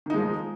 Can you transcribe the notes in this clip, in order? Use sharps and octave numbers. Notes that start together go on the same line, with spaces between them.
D#3 F3 G#3 D#4